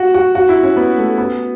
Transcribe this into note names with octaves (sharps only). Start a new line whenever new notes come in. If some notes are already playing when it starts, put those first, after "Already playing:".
Already playing: F#4
F#4
F#4
E4
C#4
B3
A3
B3